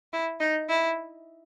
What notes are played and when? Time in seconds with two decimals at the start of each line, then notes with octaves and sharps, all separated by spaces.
0.13 E4
0.40 D#4
0.69 E4